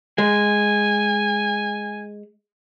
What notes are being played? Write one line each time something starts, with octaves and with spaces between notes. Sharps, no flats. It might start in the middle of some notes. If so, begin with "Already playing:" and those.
G#3 G#5